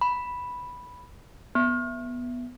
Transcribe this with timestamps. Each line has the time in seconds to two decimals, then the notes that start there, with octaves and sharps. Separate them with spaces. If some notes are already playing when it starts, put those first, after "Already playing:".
0.01 B5
1.55 B3